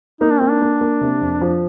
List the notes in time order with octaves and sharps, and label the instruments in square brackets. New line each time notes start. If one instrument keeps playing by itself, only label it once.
[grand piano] A#3 [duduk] D#4
[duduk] D4
[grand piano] A#3 [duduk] C4
[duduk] D4
[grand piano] A#3
A#3
C3
F2
F3